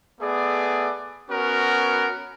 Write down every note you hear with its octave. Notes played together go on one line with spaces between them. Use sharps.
A3 B3 G#4 D5
B3 C#4 F#4 A#4